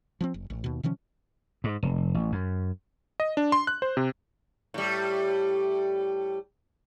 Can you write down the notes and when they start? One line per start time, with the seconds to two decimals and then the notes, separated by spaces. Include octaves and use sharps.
0.21 F3 B3 C4
0.34 F#1
0.50 A1
0.64 D#2 B2
0.83 C3 D#3 F3 C#4
1.64 G#2
1.83 F1
2.14 A1
2.32 F#2
3.20 D#5
3.37 D4
3.52 C6
3.67 F#6
3.82 C5
3.97 C3
4.74 A2 G3